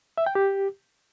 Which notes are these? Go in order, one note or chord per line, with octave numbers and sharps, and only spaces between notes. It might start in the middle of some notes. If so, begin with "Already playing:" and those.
E5
G5
G4